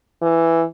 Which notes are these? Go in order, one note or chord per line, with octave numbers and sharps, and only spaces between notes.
E3